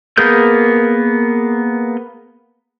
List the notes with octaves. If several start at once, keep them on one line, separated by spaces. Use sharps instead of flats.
A#3 B3 G#4 A#4 G6